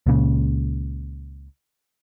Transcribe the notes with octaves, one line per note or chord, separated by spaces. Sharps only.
C#2 A#2 C#3